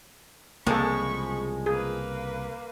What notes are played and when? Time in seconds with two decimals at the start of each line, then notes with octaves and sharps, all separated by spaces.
0.67 C2 C#3 F3 G#3 A#3 A4 B5 C#6
1.66 A#3 G#4 B4